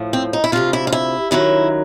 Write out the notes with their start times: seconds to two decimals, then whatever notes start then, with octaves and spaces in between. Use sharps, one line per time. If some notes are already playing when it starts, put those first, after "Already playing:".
Already playing: A2 F3
0.13 C4
0.33 D#4
0.44 E4
0.52 D2 C3 F3 F4
0.73 E4
0.87 F4
0.93 E4
1.31 F#2 D#3 F#3 E4